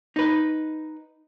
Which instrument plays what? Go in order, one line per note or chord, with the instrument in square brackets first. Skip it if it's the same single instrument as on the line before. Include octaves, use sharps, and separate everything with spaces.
[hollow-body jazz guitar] D#4 B4